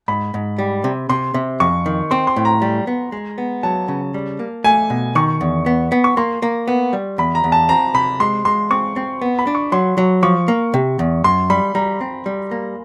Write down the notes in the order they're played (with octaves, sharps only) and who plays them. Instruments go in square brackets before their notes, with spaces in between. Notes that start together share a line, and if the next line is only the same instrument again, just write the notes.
[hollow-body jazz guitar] G#2 [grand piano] B5
[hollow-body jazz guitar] G#2
G3
C3
[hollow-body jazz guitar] C3 [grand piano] C6
[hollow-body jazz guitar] C3
[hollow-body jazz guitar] F2 [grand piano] C#6
[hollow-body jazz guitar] D#3
[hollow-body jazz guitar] C4 [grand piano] C6
[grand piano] C6
[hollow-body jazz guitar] A2
[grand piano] A#5
[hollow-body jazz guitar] G3
B3
G#3
B3
[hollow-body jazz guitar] F#3 [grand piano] A5
[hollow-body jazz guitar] C#3
G3
A#3
[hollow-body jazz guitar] A3 [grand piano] G#5
[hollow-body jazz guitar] B2
[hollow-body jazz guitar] D#3 [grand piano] C#6
[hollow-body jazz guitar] E2
B3
B3
[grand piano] C#6
[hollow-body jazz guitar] A#3 [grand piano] C6
[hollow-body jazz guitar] A#3
B3
G3
[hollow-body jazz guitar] E2 [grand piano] B5
[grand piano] A#5
[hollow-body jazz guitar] E2
[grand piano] A5
[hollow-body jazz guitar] C4 [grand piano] A#5
[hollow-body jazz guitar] C3 [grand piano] B5
[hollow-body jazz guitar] G#3 [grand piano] C6
[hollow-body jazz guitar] G#3 [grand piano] C6
[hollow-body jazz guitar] C4 [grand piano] C#6
[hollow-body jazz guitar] C4
B3
[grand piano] B5
[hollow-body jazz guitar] D4
[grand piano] C#6
[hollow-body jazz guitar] F#3 [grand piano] C6
[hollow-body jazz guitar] F#3
[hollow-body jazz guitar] F3 [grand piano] C#6
[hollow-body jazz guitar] A#3
C3
E2
[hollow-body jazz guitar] F#2 [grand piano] C6
[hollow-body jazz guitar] G3 [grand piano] B5
[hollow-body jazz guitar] G3 [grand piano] A#5
[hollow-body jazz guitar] C4
G3
A#3